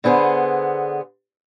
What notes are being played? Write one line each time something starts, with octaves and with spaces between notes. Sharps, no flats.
D3 B3 G#4 C5